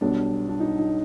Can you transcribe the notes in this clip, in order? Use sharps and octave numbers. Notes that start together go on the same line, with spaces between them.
B1 B2 G3 D4
D4
D#4
D#4